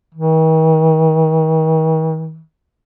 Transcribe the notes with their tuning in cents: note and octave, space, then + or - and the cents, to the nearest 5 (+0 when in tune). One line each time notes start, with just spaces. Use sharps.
D#3 +45